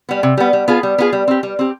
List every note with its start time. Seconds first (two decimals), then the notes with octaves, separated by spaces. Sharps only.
0.09 G3 B3
0.23 C3
0.37 G3 B3
0.53 G3
0.68 B3 F4 G#4
0.83 G3
0.98 B3 F4 G#4
1.13 G3
1.28 C4 G4
1.43 G3
1.59 C4 G4